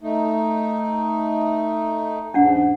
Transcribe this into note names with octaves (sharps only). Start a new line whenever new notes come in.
A3 D#4
E2 G#2 C#4 D4 F#5